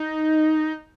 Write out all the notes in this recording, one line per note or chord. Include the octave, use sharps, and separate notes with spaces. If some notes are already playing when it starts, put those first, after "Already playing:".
Already playing: D#4